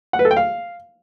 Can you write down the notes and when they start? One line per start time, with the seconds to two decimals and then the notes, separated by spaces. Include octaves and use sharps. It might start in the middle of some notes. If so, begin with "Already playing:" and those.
0.13 F#5
0.19 B4
0.25 A4
0.31 G5
0.37 F5